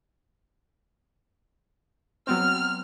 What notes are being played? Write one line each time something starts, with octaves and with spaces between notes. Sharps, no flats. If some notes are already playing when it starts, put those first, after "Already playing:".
F#3 B3 C4 F6